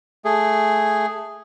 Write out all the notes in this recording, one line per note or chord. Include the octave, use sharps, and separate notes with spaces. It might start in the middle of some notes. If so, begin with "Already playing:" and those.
A3 G#4